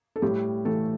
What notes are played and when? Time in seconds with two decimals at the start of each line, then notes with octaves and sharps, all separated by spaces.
0.16 A4
0.22 A2 G3 G4
0.65 E3 A3 A4